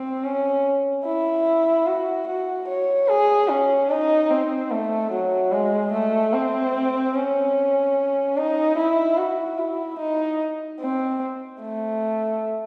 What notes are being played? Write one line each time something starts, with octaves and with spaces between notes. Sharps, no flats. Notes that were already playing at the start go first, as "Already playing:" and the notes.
Already playing: C4
C#4
E4
F#4
F#4
C#5
G#4
C#4
D#4
C4
A3
F#3
G#3
A3
C4
C#4
D#4
E4
F#4
E4
D#4
C4
A3